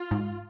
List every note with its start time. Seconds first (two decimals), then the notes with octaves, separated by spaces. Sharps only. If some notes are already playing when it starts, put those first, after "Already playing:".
Already playing: F4
0.11 G#2